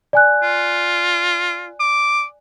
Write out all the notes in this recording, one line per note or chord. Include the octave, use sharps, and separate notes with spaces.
D5 G#5 F#6
F4
D6